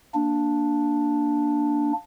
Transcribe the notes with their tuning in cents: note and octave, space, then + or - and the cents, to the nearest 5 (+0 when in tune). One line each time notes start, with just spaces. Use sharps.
A#3 +0 D4 +0